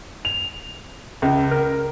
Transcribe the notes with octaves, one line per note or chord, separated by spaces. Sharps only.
F7
C#2
A#4